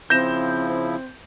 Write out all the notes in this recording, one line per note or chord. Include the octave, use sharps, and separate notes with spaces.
C#3 F3 C4 E4 G6 A#6 E7